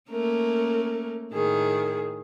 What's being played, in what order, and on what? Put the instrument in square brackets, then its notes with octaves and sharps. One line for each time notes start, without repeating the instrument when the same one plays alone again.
[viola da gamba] A3 A#3 C#4 [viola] A#4
[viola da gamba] A2 [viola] D#3 G#4